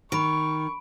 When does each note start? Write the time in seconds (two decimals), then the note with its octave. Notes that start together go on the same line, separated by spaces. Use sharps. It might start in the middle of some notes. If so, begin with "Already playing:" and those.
0.12 D#3 B5 C#6 D7